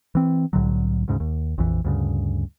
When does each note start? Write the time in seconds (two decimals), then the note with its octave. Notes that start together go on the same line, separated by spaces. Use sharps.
0.15 E3 C4
0.53 C2 A2 D3 F#3
1.08 D2 G#2 C#3
1.20 D#2
1.58 A#1 F2 E3
1.84 D2 G2 C#3